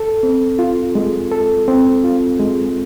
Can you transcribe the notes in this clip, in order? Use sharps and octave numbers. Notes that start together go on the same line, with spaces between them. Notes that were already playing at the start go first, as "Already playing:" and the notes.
Already playing: A4
C4
F4
G#3
A4
C4
F4
G#3